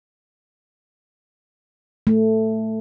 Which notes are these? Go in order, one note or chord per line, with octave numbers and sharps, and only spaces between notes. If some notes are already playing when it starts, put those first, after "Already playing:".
A3